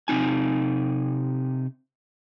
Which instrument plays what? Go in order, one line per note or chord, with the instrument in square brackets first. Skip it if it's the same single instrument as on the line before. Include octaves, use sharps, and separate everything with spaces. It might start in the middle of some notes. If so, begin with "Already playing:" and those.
[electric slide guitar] C3 C4 D#4 G#5